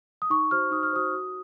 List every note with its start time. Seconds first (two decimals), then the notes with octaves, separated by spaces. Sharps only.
0.22 D#6
0.30 D#4 C#6
0.51 F#4 C5 F6
0.71 D#4 D#6
0.83 F6
0.93 F#4 C5 D#6
1.13 F#4